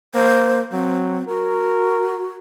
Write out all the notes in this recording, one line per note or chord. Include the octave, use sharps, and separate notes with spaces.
A#3 C5
F#3 C4
F#4 A#4